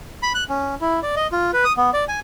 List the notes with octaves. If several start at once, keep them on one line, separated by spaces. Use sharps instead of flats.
B5
F#6
C#4
E4
D5
D#5
F4
B4
D#6
B3
D5
G#5